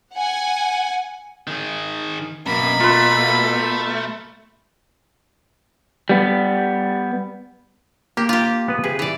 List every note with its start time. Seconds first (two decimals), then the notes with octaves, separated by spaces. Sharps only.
0.12 F#5 G#5
1.47 D#3 G#4
2.47 F#2 B2 A#3 B5
2.80 A3 F4 B4
6.09 G3 B3
8.17 A#3 G4
8.29 F4 G4
8.68 B3 B4
8.84 C3 G#4 B4
8.99 E3 D5